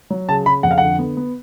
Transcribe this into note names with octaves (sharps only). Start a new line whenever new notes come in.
F#3
C#3 A5
C#3 B5
F2 F#5
F5
D3 F#5
B3
B3